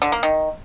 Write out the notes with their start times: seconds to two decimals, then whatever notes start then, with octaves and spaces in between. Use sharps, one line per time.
0.02 D3
0.12 A#3
0.23 D#3